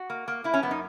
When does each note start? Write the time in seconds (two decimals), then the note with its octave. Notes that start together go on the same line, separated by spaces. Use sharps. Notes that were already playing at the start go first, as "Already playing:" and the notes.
Already playing: F#4
0.10 A#3
0.28 A#3
0.44 A#3 E4
0.54 C#4
0.62 F#2 B3
0.71 D#4